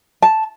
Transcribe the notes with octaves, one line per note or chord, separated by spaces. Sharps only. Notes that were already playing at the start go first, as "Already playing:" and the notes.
A5